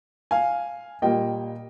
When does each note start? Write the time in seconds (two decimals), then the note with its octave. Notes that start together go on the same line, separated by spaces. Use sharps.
0.31 F5 G#5
1.02 A#2 G3 A#3 D#5 G5